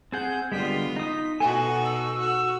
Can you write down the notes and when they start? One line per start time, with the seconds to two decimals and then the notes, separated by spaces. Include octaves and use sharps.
0.12 C4 G#4 F#5 G6
0.52 D3 G3 G#3 B3 F4 B6
0.96 D#4 D#6
1.40 B2 D#4 F#4 A4 G#5
1.84 E6
2.19 F#4 E6